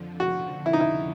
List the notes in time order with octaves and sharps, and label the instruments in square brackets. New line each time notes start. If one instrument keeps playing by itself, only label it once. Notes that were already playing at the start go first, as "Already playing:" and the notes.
Already playing: [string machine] F2 D3 F3
[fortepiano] F#4
E4
D#4
E4